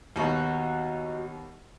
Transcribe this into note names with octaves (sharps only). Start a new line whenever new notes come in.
D#2 B2 D#4 F#4